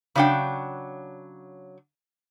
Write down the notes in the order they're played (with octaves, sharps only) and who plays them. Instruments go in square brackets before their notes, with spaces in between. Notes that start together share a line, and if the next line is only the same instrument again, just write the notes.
[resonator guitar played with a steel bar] C#3 F#3 D4 F#5 G5